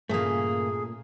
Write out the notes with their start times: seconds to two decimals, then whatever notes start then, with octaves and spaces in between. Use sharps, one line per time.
0.09 G2 A#2 C#3 A3 A#3 G#4